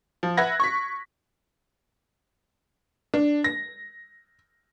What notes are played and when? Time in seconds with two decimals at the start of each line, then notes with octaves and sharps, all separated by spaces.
0.23 F3
0.37 B4 E5 F#5 F#6 G#6 A#6
0.60 C#6 B6
3.14 D4
3.44 A#6